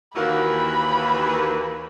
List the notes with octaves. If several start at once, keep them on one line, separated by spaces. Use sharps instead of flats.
D#2 E3 F#4 A#4 F5 B5